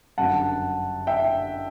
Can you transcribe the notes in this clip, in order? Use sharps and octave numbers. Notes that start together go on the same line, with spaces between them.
G1 F#2 F#3 F#5 A5
E5 G5